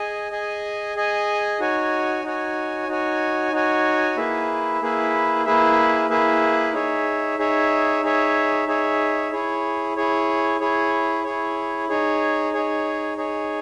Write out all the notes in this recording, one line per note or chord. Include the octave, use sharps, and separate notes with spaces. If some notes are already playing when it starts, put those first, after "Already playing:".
Already playing: G#4 D#5 G#5
G#4 D#5 G#5
G#4 D#5 G#5
D#4 F#4 C#5 G#5
D#4 F#4 C#5 G#5
D#4 F#4 C#5 G#5
D#4 F#4 C#5 G#5
A#3 E4 G#4 B4 E5
A#3 E4 G#4 B4 E5
A#3 E4 G#4 B4 E5
A#3 E4 G#4 B4 E5
D#4 G#4 C#5 E5
D#4 G#4 C#5 E5
D#4 G#4 C#5 E5
D#4 G#4 C#5 E5
E4 G#4 C#5
E4 G#4 C#5
E4 G#4 C#5
E4 G#4 C#5
D#4 G#4 C#5
D#4 G#4 C#5
D#4 G#4 C#5